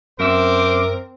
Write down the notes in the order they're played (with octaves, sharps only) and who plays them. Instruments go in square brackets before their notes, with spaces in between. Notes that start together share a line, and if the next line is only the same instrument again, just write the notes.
[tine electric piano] F#2 E5 E6 [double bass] C4 [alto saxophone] A#4 [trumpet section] C5 D6